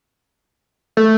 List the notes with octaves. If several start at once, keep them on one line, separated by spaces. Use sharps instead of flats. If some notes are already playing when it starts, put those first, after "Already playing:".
A3